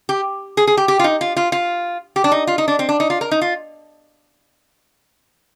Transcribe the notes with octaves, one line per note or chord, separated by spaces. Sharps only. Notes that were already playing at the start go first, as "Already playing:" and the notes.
G4
G#4
G#4
G4
G4
F4
D#4
F4
F4
F4
G4
D4
D#4
F4
D#4
D4
C4
D4
D#4
F4
A#4
D#4
F4